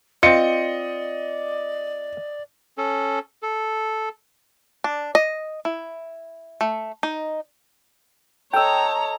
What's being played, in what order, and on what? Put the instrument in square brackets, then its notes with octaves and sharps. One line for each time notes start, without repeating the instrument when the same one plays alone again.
[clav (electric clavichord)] C4 F4 [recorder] D5 [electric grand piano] D#5 [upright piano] C#7
[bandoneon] C#4 A4
A4
[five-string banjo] D4
D#5
E4
A3
D#4
[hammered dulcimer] A4 D#5 [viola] C#5 A#5 [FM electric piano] G5 E6